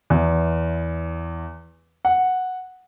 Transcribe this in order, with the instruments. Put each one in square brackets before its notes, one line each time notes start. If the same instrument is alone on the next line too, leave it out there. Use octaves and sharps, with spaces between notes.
[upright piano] E2
F#5